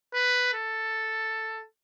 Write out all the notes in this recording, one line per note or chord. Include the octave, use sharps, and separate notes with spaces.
B4
A4